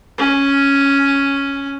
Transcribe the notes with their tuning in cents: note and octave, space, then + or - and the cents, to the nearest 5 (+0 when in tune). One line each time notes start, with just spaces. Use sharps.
C#4 +0